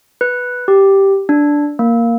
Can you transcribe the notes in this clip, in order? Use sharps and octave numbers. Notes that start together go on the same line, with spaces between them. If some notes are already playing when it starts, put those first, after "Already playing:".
B4
G4
D4
A#3